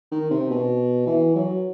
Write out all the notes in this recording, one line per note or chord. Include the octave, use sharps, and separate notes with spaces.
D#3
C3
B2
E3
F#3